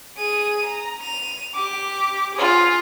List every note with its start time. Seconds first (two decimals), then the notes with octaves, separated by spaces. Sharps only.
0.18 G#4 D#7
0.65 A#5
1.00 D#7 F7
1.55 G4 D6
2.34 F4 G#4